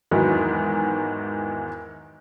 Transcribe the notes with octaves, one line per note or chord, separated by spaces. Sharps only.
E2 G#2 D#3 E3 F#3